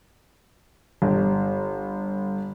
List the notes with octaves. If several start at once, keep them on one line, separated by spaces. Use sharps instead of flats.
G1